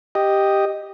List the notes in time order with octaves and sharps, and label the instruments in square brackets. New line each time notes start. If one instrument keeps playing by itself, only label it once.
[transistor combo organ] G4 D#5